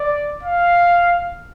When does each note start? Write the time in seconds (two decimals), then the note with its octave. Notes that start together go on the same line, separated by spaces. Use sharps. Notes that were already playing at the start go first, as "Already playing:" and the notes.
Already playing: D5
0.43 F5